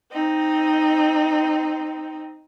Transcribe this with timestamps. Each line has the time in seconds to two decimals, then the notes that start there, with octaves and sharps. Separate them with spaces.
0.11 C4 D#4